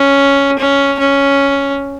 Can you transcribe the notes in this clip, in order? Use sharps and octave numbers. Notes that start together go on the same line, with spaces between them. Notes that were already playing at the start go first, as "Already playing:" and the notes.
Already playing: C#4
C#4
C#4